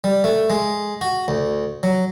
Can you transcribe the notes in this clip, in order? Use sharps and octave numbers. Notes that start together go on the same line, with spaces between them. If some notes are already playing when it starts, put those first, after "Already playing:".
G3
A3
G#3
F#4
D2
F#3